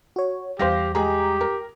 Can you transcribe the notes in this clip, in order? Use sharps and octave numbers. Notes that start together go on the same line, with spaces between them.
F#4 C#5
E2 G3 G4 C5 F5 A#6
G#3 G4 G#4 A#5
A#4